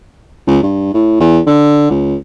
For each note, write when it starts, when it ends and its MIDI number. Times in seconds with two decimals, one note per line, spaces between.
0.47 0.58 37
0.63 0.93 43
0.94 1.17 45
1.20 1.39 40
1.47 1.90 50
1.90 2.16 37